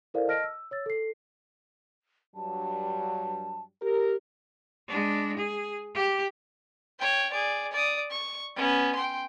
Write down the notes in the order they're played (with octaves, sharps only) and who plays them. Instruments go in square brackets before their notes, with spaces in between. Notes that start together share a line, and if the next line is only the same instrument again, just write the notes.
[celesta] E4 A4 A#4 C5 D5 F5
D#5 A5 F6 A#6 D7
E6
C#5 E6 A6
A4 C7
[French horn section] G2 F#3 G3 [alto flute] A5
[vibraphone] G4 [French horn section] A#4
[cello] G#3 D4
G#4
G4
[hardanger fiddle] C#5 G5
G#4 D5
D5 D#6
C#6
B3 C#4
G5 C6